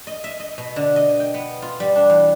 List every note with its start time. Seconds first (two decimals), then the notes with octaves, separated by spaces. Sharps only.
0.07 D#5
0.24 E5
0.40 D#5
0.58 B2
0.76 D3
0.96 D#5
1.20 G5
1.34 B3
1.62 F4
1.80 G3
1.96 D4
2.10 E2